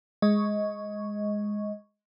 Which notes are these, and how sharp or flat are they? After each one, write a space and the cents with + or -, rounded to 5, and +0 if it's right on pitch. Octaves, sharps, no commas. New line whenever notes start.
G#3 +0 D#5 +15 C#6 +0